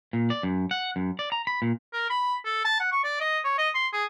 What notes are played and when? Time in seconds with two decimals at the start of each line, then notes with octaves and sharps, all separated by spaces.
0.13 A#2
0.30 D5
0.43 F#2
0.71 F#5
0.96 F#2
1.19 D5
1.32 A#5
1.47 B5
1.62 A#2
1.93 A#4
2.10 B5
2.45 A4
2.65 A5
2.80 F#5
2.92 C#6
3.04 D5
3.20 D#5
3.44 C#5
3.58 D#5
3.74 C6
3.93 G#4